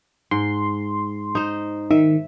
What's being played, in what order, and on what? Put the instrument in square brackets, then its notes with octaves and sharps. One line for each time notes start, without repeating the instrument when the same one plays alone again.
[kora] G#2 [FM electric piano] C6
[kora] D#4 C5
[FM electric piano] D#3 [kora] E5